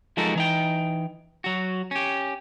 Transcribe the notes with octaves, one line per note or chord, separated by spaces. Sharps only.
F3 G#3 D#4 F#4 A4 A#4
E3 D#4 G5
F#3 F#4
C#4 G4